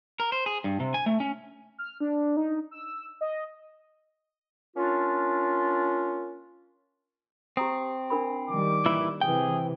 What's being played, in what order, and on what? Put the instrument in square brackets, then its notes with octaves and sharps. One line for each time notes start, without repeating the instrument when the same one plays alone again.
[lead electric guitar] A#4
C5
G#4
G2
C3
G#5
A3
C#4
[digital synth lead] F6
D4
D#4
E6
D#5
[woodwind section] A#3 C#4 D4 F4
[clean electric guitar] C4 [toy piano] G4 A#5 D#6
[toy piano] D4 A#4 B5
[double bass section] D#3 G3 [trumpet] D6
[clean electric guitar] A#2 E3 E4
[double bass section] C3 E3 [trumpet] G#4 [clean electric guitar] G5